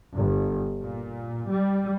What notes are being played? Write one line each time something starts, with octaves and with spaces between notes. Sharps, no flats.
G1
A#2
G3